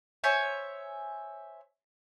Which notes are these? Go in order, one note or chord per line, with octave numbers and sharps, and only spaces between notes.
C5 C#5 E5 G#5